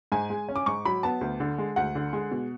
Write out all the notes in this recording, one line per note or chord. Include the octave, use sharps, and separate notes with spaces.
G#2 G#5
G#3
C#4
D6
G#2 C#6
F#3 B5
B3 A5
D2
D3
G#3
D2 F#5
D3
G#3
B2